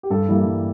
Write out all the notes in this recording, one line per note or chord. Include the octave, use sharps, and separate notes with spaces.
G4
G2 A4
E3 G3 A#3
G2